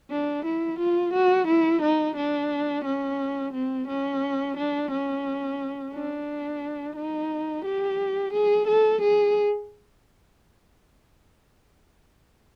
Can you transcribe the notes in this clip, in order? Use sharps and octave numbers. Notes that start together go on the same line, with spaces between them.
D4
E4
F4
F#4
E4
D#4
D4
C#4
C4
C#4
D4
C#4
D4
D#4
G4
G#4
A4
G#4